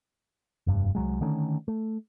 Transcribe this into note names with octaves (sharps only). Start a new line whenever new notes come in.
F1 G2
C2 F#2 F#3 G#3
D3 D#3 A3 C#4
A3